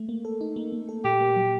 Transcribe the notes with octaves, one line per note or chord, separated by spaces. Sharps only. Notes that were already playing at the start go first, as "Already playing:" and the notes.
Already playing: A3
A#3
A4
D#4
A#3
A#3
A4
A#2 G4
A#3
F#3